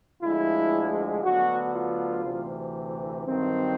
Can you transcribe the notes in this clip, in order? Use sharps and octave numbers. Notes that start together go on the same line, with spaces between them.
D2 D3 F3 G#3 E4
D2 D3 F#3 B3 F#4
F4
D2 C3 E3
G2 D#3 F#3 C4